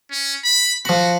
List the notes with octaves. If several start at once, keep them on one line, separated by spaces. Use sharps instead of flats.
C#4
B5
F3 F#4 B5